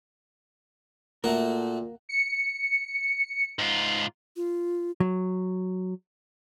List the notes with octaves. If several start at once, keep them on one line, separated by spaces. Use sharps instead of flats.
A#2 A3 A#3 F#4 A#4
C#7
G#2 F4
F4
F#3